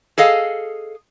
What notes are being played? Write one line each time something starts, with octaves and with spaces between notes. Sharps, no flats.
G#4 A4 D#5 F5